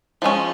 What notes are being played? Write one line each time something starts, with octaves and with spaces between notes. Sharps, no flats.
F3 G#3 C#4